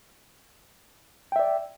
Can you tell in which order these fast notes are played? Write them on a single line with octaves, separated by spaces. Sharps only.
G5 E5 D5